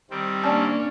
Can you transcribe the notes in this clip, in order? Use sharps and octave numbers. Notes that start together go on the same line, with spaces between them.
D#3 G3 C4
A#3 C#4 D4 D5 G#5 A5